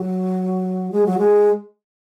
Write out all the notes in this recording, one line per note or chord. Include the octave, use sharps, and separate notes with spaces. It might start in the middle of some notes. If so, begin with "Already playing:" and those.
Already playing: F#3
G#3
F#3
G#3